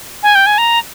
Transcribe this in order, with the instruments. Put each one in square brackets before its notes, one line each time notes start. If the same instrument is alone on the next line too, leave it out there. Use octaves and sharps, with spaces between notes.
[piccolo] G#5
G5
G#5
A#5